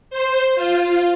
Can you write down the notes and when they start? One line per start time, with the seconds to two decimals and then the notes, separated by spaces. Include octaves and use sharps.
0.10 C5
0.56 F4